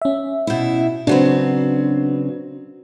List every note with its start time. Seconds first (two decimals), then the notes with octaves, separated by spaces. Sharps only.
0.02 C#4 E5
0.47 B2 E4
1.07 C#3 F#3 C4 D4 F#4 B4